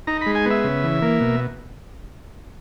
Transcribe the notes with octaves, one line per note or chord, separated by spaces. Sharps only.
D#4 A#5
G#3 B5
G#5
B3 E5
C#3
E3
A#3
B2